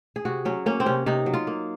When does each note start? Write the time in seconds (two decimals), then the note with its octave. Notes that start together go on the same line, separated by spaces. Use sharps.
0.16 G#4
0.25 C3 F#4
0.45 F#3 C#4
0.66 A#3 C#4
0.80 C4
0.86 C3 C#4
1.06 C3 D#4
1.26 F#3
1.34 F4
1.47 A#3